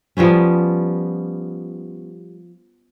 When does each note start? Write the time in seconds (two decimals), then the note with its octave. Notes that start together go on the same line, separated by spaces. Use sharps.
0.17 F3 G3 B3 C#4